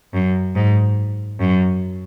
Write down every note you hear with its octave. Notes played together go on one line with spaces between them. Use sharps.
F#2
G#2
F#2